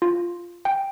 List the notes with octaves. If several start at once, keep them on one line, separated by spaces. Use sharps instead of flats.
F4
G5